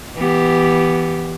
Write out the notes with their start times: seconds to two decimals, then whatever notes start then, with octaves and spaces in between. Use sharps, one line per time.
0.15 E3 B3 G4